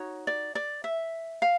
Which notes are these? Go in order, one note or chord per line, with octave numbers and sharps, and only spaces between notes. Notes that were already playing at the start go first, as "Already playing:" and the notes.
Already playing: D#4 F#4 C#5
D5
D5
E5
F5